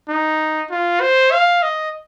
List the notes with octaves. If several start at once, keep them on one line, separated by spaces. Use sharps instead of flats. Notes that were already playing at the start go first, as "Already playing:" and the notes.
D#4
F4
C5
F5
D#5